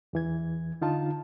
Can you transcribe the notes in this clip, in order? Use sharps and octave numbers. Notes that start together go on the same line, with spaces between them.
E2 E3 G#6
D3 D#4 F4 A5